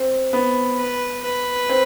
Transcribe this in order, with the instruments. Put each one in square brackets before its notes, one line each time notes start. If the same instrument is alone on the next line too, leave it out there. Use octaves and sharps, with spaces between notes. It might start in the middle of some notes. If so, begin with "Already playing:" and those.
Already playing: [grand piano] C4
B3
[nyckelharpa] B4
B4
[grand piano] C4